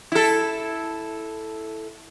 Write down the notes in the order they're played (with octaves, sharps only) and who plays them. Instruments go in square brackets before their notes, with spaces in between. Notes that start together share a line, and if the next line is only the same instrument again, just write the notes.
[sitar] E4 A4